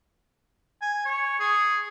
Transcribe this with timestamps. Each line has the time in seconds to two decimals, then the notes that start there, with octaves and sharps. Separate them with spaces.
0.82 G#5
1.06 C#5
1.40 G#4